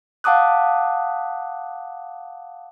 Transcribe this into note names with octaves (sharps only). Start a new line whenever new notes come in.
F5 F#5 A5 D6 D#6 F#6